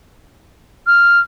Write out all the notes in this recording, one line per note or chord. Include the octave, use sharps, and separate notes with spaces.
F6